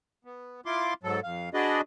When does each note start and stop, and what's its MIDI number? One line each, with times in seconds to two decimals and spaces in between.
0.25 0.61 59
0.66 0.94 64
0.66 0.94 65
0.66 0.94 84
0.66 0.94 86
1.03 1.20 44
1.03 1.20 54
1.03 1.20 69
1.23 1.49 41
1.23 1.49 77
1.54 1.81 62
1.54 1.81 66
1.54 1.81 68
1.54 1.81 71
1.54 1.81 74
1.54 1.81 75